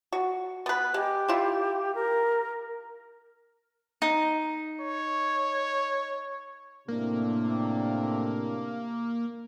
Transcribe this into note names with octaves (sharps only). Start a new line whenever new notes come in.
F#4
B3 B4
G#3 G4
E4 F4
A#4
D#4
C#5
A2 C3 A#3 D4